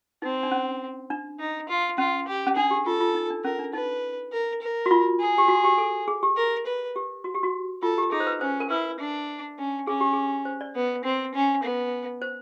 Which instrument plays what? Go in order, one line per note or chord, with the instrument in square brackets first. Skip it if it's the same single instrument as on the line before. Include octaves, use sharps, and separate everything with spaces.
[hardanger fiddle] C4 [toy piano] D#4
[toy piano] D4
C#4
D4
[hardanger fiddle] D#4
F4
[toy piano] C#4 [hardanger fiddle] F4
[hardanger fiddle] G4
[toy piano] C#4
[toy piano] D4 [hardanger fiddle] G#4
[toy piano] G4
[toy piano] F4 [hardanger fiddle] A4
[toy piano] F4
D#4
D4
[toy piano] C#4 [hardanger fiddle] A#4
[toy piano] D4
[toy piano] D#4 [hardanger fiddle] B4
[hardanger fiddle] A#4
A#4
[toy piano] F#4
F4
[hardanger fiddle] G#4
[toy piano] G4
F#4
G4
A4
G#4
G4
[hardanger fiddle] A#4
B4
[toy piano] G4
F#4
G4
F#4
[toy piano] F4 [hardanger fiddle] A4
[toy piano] G4
[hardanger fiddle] D#4 [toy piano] G#4
[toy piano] C5
B4
[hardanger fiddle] C#4 [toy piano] C5
[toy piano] A#4
[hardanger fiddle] E4 [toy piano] B4
[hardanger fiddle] D4
C#4
[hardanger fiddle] C#4 [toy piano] G#4
[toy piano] G4
G#4
C5
D5
[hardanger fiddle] B3
C4
C#4
B3
[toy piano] C5